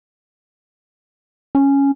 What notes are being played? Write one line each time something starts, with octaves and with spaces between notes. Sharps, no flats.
C#4